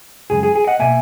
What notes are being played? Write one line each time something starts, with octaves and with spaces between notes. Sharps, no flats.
F#2 C#3 G#3 G#4
G#4
G#4
D#5 F#5
B2 A#3 E5 G#5